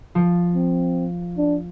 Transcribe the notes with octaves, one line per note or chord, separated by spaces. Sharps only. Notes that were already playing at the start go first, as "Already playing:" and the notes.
F3 C#7
C4
D4